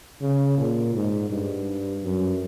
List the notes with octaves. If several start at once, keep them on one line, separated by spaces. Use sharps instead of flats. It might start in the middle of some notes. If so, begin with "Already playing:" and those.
C#3
A#2
G#2
G2
F#2